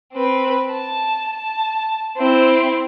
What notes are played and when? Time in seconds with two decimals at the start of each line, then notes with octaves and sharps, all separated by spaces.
0.13 C4 B4
0.71 A5
1.33 A5
2.18 C4 E4